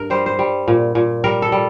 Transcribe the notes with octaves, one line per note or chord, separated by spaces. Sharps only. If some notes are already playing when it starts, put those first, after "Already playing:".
Already playing: G2 A#4
G3 C5
C5
G3
A#2
A#2
G3 A#4
A4
G3